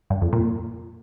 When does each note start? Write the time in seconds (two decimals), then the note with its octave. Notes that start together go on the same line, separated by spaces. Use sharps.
0.10 G2
0.22 F2
0.33 A#2